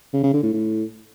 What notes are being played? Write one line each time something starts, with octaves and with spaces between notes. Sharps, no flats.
C#3
C#3
D3
A2
A2